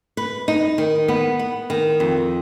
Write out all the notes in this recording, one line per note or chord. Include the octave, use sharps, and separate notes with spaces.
B4
D#4
D#3
B3
B3
D#3
F2